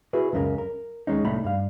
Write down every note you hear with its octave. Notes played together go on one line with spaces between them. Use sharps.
E4 F#4 G#4 B4
C#2 F#2 C#3 G4 A#4
A#4
D#2 G#3 C#4 D#4
C2 A2 A3 D#4 A#5 B5
G2 F5